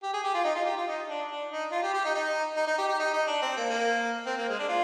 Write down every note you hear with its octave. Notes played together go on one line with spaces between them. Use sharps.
G4
G#4
G4
F4
D#4
F4
G4
F4
D#4
D4
D4
D#4
F4
G4
G4
D#4
D#4
D#4
D#4
G4
G4
D#4
D#4
D4
C4
A#3
A#3
C4
A#3
G#3
D4
F4